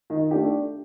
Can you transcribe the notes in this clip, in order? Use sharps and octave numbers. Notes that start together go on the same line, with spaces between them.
D#3
A3 D4 G4